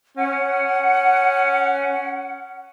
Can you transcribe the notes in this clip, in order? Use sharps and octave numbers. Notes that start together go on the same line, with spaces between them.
C#4 F#5